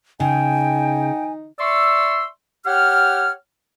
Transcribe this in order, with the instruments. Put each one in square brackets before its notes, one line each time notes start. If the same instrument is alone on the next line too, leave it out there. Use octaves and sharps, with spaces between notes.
[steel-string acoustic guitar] C#3 [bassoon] D#4 [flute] G5 [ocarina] G#5
[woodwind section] D5 E5 C6 C#6 E6
G4 C#5 F#5 G5 F6